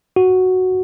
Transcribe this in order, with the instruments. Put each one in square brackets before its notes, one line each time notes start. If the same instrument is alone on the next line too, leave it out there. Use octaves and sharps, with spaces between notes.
[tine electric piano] F#4